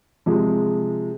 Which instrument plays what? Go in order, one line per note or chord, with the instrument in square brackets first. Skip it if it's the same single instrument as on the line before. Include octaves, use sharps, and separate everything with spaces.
[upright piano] C3 F3 G#3